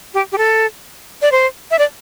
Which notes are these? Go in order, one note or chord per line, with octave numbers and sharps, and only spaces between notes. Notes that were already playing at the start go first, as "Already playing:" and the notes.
G4
G4
A4
D5
C5
E5
D5